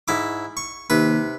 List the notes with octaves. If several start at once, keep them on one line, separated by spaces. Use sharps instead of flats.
G#2 E4 D6
C#6
D#2 C3 B4